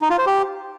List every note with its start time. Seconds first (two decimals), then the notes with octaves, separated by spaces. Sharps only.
0.02 D#4
0.10 F4
0.18 C5
0.27 G4